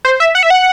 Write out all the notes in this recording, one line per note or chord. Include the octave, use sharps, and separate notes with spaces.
C5
E5
F#5
E5
F#5